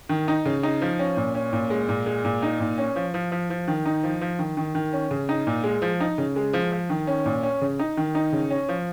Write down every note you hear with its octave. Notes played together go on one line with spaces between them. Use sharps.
D#3
D#4
C#3
D#4
F3
C#4
A#2
C#4
A#2
G#3
A#2
G#3
A#2
D#4
A#2
C#4
F3
F3
F3
F3
D#3
D#4
F3
F3
D#3
D#3
D#3
C#4
C#3
D#4
A#2
G#3
F3
D#4
C#3
G#3
F3
F3
D#3
C#4
A#2
C#4
C#3
D#4
D#3
D#4
C#3
C#4
F3